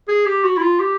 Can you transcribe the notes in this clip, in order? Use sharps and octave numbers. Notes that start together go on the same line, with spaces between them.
G#4
G4
F#4
E4
F4
G4